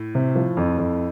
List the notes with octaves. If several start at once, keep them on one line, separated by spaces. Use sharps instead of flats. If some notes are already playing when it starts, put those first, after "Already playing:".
Already playing: A2
C3
F3
F2
F2